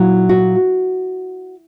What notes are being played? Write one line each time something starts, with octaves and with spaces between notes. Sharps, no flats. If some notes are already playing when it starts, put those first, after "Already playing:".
Already playing: A#2 F#3 E4
F#4